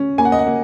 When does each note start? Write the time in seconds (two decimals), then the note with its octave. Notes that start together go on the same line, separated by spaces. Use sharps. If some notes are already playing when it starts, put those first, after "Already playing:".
Already playing: C#4
0.18 A#3 G#5
0.25 F#5
0.32 D#5
0.39 F#5
0.47 A#3